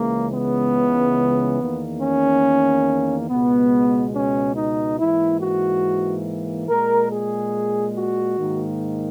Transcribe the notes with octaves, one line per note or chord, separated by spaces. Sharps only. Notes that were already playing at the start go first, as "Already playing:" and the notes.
Already playing: C#2 C#3 E3 G#3 A#3
B3
E2 D#3 A#3
C#4
C#2 B2 G#3 B3
C#4
D#4
G#2 E3 A#3 E4
F#4
A#2 G#3 A#4
G#4
F#4
G#2 D#3 A#3